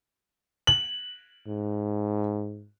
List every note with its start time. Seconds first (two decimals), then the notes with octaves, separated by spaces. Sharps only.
0.67 F#7
1.47 G#2